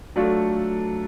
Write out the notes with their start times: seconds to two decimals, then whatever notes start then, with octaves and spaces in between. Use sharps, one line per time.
0.16 F#3 A3 D4 F4 A4